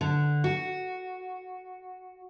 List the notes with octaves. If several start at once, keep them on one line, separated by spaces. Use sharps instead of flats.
D3
F#4